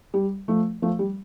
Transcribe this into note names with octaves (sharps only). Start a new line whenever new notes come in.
G3
F3 A3
F3 A3
G3